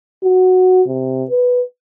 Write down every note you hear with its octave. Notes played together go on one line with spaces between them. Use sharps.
F#4
C3
B4